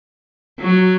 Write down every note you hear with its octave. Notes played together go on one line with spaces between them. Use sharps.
F#3